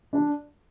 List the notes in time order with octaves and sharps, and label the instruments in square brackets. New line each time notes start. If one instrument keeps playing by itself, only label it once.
[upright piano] D4